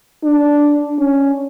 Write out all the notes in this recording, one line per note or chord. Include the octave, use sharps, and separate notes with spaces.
D4
C#4